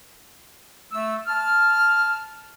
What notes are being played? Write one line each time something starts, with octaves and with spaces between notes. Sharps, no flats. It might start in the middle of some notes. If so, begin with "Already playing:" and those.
A3 E6
A5 F6